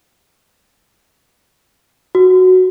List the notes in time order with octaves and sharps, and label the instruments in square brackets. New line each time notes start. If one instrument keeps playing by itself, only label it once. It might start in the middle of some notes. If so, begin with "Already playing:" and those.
[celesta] F#4